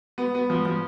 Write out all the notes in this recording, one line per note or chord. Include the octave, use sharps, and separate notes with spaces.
B3
B3
F3
F3